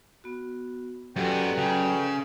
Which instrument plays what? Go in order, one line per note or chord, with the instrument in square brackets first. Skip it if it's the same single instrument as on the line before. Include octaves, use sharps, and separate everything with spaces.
[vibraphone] B3 F#4
[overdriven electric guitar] F#2 B3 [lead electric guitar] F#3 [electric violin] G4 [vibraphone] A4 B4 D5
[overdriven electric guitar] C#3 [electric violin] G5